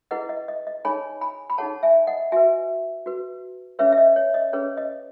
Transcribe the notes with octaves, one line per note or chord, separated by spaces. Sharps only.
E4 G#4 B4 D#5 F#5
D#5
D#5
D#5
D#4 G#4 C#5 G#5 B5
G#5 B5
B5
D#4 G#4 C#5 F#5 A5
E5 G#5
D#5 F#5
F#4 B4 E5 G#5
F#4 B4
C#4 G#4 B4 C#5 E5
E5
D#5
C#5
D#5
C#4 G#4 B4 C#5
D#5